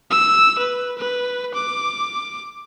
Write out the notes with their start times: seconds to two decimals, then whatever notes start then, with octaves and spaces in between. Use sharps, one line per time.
0.10 E6
0.58 B4
0.98 B4
1.54 D6